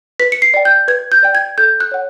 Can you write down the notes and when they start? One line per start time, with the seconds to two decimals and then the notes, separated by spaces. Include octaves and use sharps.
0.20 B4 B6
0.32 C#7
0.42 C7
0.54 D5 G5
0.65 G6
0.88 B4 G#6
1.12 G6
1.23 D5 G5
1.35 G#6
1.58 A4 G6
1.80 F#6
1.92 C#5 F#5